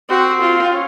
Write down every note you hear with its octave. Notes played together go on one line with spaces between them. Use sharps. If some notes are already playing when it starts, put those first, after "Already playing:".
C4 F#4
F4
C#4